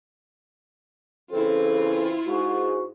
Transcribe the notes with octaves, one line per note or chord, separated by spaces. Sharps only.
C#3 E3 C4 E4 F4 A4
G#2 F#4